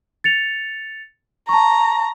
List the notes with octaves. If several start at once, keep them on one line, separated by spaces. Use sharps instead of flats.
A6 C#7 F7
A5 A#5 C#6